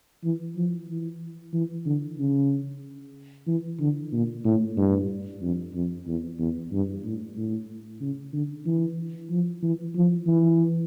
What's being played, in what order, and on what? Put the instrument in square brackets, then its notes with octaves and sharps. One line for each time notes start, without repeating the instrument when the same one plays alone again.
[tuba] E3
F3
E3
E3
D3
C#3
E3
D3
A#2
A2
G2
F2
F2
E2
E2
G2
A2
A2
C#3
D3
E3
F3
E3
F3
E3